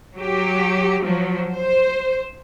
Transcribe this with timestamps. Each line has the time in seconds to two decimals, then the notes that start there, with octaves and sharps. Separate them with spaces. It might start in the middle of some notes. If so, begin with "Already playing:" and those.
0.16 F#3 G4
1.03 F3 F#3
1.52 C5